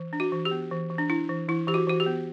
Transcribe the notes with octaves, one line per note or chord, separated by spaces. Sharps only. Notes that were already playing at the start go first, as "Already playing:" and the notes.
Already playing: E3
D4
F#4
E3
G4
B3
E3
E3
D4
D4 E4
E3
E3 E4
E3 G4
F#4
E3 F#4
G4
B3